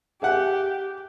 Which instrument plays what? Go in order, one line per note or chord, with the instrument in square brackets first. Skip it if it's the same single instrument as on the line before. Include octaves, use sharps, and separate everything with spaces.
[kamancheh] G4 [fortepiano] G#4 E5 F#5